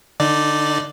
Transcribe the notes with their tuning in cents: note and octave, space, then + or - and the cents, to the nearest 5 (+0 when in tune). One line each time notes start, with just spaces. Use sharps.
D3 +15 D#4 -10 D5 +0